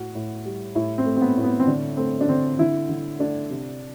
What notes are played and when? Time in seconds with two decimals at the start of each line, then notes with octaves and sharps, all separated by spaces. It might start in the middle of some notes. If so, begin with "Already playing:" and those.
Already playing: A2 F#4
0.15 A2
0.45 G3
0.75 A2 E4
0.98 C4
1.06 A3
1.16 C4
1.22 B3
1.37 A2
1.44 B3
1.60 C4
1.67 D3 D4
1.97 A3 C4
2.21 D4
2.27 D3 C4
2.59 D3 E4
2.89 D3
3.19 A3 D4
3.50 C3